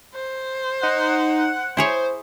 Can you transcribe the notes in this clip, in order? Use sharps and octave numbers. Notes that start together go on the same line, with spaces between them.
C5
D#4 F#5
E4 G#4 C5 C#5